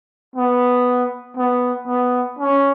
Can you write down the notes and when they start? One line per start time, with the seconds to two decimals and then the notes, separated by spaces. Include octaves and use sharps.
0.36 B3
1.37 B3
1.87 B3
2.39 C#4